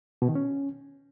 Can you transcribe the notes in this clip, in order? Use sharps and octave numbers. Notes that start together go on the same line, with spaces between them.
B2
D#3
C#4